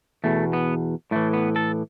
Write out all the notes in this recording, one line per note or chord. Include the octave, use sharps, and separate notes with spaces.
E2 B2 A3
B3
A2 E3 A3
B3
A4